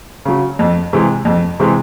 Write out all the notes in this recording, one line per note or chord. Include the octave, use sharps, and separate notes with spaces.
C#3 F#3
F2
C3 E3 G#3
F2
C3 E3 G#3